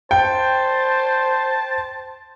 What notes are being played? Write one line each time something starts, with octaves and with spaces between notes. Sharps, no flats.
C5 G5 A5